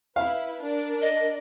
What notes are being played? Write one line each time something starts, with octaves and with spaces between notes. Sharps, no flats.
E4 B4 F5
D4 A#4 D5
D#5